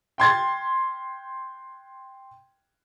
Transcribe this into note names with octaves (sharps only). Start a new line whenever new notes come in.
G5 C6 G#6 A6